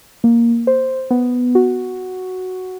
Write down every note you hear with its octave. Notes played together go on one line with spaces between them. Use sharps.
A#3
C5
B3
F#4